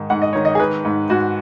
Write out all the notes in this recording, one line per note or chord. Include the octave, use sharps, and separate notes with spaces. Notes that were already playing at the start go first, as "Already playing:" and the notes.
Already playing: G#2 D#3
G#2 F#5
D#5
D#3 C#5
D#5
G#4
D#3 B4
G#2
G#2 F#4